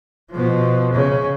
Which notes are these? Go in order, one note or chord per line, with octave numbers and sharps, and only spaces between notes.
B2 F3
C#3